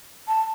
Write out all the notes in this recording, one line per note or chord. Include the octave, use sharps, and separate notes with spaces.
A5